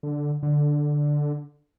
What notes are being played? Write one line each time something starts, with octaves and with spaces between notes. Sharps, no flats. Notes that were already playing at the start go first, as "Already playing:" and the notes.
D3
D3